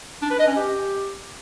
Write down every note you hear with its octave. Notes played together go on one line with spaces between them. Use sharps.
D4
B4
D#5
C#4
G4